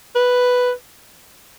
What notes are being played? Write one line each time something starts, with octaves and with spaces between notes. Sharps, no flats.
B4